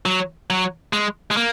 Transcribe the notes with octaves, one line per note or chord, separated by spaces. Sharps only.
F#3
F#3
G#3
G#3
A#3